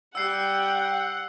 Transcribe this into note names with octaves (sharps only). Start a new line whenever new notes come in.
G3 F#5 G5 E6 C7